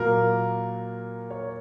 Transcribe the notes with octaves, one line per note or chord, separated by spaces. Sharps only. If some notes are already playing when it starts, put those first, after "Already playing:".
Already playing: A#2 F#3 A#3 A#4
C#5